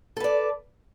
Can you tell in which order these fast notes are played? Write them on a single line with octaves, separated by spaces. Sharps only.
A4 B4 D5